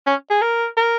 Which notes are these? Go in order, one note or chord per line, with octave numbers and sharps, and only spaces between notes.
C#4
G#4
A#4
A#4